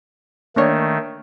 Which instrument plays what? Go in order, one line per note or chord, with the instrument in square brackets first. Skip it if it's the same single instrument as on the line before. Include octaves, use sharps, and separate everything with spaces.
[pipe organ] D#3 A3 [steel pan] A#3 D4 C#5